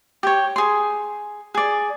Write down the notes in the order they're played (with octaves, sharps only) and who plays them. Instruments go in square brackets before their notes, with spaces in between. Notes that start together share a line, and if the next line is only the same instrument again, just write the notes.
[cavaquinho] G4 C#5
G#4 C6
G#4 D5